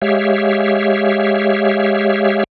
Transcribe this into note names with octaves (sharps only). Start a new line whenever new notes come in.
G#3 G4 C#5 E5 F5